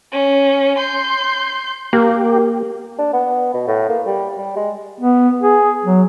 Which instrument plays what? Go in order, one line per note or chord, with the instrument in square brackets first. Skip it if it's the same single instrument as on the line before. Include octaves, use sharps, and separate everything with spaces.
[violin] C#4
C6 G6
[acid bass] A#3 [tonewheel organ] G4 [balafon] A#4
[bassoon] D4
B3
B2
A2
A#3
G3
G3
G#3
[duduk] B3
G#4
F#3